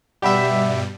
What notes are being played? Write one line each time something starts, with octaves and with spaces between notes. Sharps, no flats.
G2 B2 G3 G4 D5 E5 F#5 B5